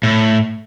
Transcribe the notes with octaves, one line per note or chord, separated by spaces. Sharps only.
A2